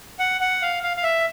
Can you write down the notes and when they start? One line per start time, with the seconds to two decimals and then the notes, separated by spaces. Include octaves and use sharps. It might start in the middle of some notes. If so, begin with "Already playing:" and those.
0.19 F#5
0.41 F#5
0.62 F5
0.83 F5
0.97 F5
1.03 E5